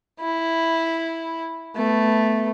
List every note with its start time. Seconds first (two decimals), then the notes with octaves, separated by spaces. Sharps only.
0.20 E4
1.76 A3 B3